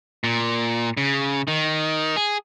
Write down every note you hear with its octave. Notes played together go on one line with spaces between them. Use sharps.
A#2
C#3
D#3
G#4